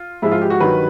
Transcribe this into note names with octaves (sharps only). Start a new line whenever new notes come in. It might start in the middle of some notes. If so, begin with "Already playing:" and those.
Already playing: F4
G#2 F3 G#3 E4
F4
G4
F#4
G2 D#3 F#3 B4